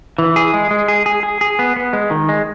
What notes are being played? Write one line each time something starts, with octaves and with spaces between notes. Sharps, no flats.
E3
G#4
G#3
G#3
G#4
G#4
G#4
G#4
B3
B3
G#3
D#3
G#3